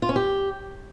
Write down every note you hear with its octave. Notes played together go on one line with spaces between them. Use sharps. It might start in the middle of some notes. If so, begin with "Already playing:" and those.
F4
C#4
G4